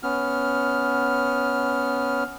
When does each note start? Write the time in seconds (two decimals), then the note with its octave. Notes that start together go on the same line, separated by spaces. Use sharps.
0.03 B3 C#4 F6